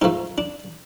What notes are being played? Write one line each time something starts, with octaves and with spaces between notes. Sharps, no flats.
G#2 F3 A3 D#4
D4